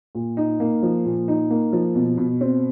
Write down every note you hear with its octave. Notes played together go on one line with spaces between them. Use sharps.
A#2
D#4
A#3
F3
A#2
D#4
A#3
F3
B2
B2
C4